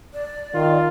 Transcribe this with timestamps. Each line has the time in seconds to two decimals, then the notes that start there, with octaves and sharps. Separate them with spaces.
0.13 D5
0.54 D#3 F4